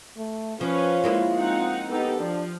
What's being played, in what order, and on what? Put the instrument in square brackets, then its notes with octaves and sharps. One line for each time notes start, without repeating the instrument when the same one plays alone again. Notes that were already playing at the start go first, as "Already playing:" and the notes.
[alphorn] A3
[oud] F3 [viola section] C#4 B4 [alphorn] F4
[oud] G#3 A#3 E4
[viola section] C4 D#4 F#5
[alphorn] B3 [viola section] D#4 G4 A4
[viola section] F3 [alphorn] D4